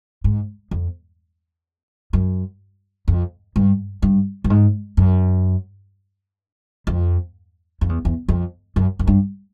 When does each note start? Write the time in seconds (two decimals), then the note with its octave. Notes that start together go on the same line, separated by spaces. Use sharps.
0.24 G#2
0.71 F2
2.13 F#2
3.08 F2
3.56 G2
4.02 G2
4.44 G2
4.50 G#2
4.97 F#2
6.87 F2
7.81 F2
7.89 E2
8.05 E2
8.29 F2
8.76 F#2
8.99 F#2
9.07 G2